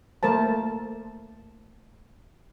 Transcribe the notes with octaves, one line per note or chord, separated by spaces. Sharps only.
A3 A#3 A#4 C5 A5